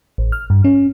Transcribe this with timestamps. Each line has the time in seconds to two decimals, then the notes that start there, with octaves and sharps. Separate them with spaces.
0.18 A1
0.32 F6
0.50 G2
0.64 C#4